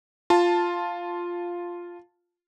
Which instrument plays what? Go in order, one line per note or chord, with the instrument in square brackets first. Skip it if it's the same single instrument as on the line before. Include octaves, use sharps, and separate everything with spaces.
[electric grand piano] F4 A5